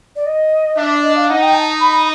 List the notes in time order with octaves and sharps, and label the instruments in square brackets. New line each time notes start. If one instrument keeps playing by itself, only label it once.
[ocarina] D5
D#5
[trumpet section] D4 [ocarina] E5
[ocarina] D#5
F5
[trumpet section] D#4 [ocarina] F#5
[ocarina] G5
A5
B5